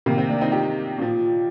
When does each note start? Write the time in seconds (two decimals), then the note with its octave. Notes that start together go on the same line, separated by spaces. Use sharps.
0.06 C3 D#3 A#3
0.18 C4
0.29 A#3 D4
0.41 C4 D#4
0.52 D#4 G4
0.98 A#2 F3